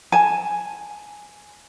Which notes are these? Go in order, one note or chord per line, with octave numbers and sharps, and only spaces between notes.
G#5 A5